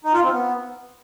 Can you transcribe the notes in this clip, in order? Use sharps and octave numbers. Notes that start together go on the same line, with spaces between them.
D#4
F4
C4
B3